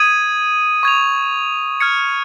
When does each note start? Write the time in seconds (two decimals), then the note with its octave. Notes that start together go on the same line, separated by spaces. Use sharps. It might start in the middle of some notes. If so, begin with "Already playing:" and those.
Already playing: D#6 G#6 D#7
0.83 C#6 G#6 F7
1.80 F6 G#6 C#7